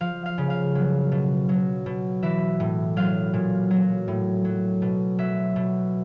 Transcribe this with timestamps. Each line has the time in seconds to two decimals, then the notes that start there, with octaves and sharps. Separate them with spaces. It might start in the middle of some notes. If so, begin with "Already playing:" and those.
0.01 F3 F5
0.26 F5
0.38 C#3
0.50 F5
0.75 F#3
1.12 B2
1.49 F#3
1.86 B2
2.23 E3 E5
2.60 A2
2.96 F#3 F5
3.34 A#2
3.71 F#3
4.08 A2
4.45 F#3
4.82 B2
5.18 F#3 E5
5.56 B2